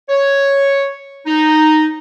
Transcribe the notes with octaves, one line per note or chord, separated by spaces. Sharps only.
C#5
D#4